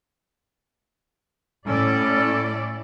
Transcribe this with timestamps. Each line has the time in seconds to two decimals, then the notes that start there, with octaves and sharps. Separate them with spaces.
1.67 A2 C#4 A4 D5